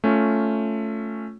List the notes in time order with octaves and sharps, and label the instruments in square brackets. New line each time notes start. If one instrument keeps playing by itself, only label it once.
[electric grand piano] A3 C#4 F4